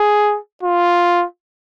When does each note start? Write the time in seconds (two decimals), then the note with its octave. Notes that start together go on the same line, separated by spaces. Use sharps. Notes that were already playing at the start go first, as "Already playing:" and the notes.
Already playing: G#4
0.63 F4